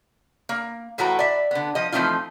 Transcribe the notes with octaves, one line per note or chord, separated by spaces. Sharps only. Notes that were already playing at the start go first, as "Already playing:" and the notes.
A#3
A2 E3 E4 F#4 A4 A#5
D5 E5
D3 B3
F3 D#5
E3 F3 A3 C4 D#4 F4